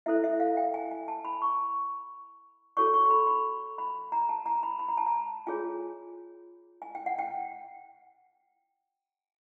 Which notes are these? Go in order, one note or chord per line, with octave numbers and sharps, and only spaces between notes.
E4 A4 C5 E5
E5
F5
G5
G#5
G#5
A5
B5
C#6
F#4 A4 C#5 C#6
C#6
C6
B5
B5
B5
A#5
A5
A#5
B5
B5
A#5
A5
A#5
F4 G#4 C#5 G#5
G#5
G5
F#5
G5